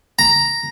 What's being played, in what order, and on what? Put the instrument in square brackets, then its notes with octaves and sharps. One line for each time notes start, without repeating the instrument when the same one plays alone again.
[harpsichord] A#5